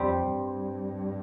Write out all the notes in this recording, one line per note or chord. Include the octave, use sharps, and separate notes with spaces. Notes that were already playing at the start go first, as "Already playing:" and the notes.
Already playing: F2 G3 C4 G4 C5
G2